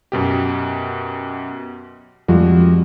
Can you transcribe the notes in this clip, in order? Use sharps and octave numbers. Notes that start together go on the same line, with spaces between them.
F#2 B2 G4
F2 G3 G#3 F#4